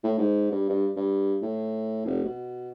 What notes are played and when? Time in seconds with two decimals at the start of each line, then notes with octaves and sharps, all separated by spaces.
0.04 A2
0.18 G#2
0.52 G2
0.70 G2
0.96 G2
1.42 A2
2.06 F1
2.24 B2